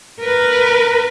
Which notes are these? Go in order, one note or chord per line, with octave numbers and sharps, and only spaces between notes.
A#4 B4